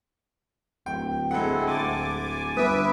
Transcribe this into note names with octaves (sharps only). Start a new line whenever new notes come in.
D1 G5
G#3 C4 E4 A4 F#5
D2 G#5 D6 A6
G1 B4 E5 D6 D#6